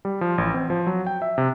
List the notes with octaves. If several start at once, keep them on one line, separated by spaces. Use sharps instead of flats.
G3
F3
A1
C4
F3
F#3
G5
E5
C3